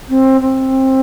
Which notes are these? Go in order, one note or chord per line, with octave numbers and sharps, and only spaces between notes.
C4
C4